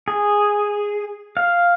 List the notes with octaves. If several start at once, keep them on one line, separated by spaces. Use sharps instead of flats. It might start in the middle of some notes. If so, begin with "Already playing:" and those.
G#4
F5